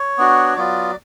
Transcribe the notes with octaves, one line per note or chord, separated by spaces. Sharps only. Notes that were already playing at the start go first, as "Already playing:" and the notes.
Already playing: C#5
B3 D4 F#4
F#3 B3 F4 D5